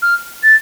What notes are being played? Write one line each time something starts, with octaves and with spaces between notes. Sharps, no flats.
F6
A6